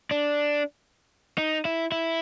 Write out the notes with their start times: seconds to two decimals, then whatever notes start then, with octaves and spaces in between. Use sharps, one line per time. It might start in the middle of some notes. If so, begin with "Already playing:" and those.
0.11 D4
1.38 D#4
1.65 E4
1.92 E4